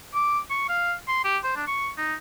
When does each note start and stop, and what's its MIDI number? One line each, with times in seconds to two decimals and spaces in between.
0.14 0.39 86
0.50 0.65 85
0.69 0.94 77
1.08 1.21 84
1.25 1.38 67
1.44 1.53 72
1.56 1.64 62
1.67 1.89 85
1.98 2.14 63